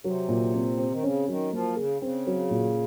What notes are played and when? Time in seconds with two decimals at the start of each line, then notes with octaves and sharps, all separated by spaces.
0.04 C3 F#3
0.29 A#2
0.54 C4
0.78 C4
0.91 D#3
1.03 C#3 C#4
1.28 D#3 F#3
1.52 F3 A#3
1.76 C#3 G#4
2.02 C#3 C4
2.27 F#3
2.51 A#2